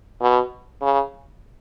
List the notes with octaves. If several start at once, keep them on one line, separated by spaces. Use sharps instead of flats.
B2
C#3